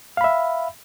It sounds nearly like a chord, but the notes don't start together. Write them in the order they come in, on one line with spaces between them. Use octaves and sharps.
F5 B5 E5